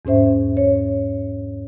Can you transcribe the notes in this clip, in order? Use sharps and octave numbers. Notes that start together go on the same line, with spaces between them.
E2 G#2 C#4 C5 E5
C#5